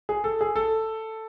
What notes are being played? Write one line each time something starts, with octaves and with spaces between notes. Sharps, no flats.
G#4
A4
G#4
A4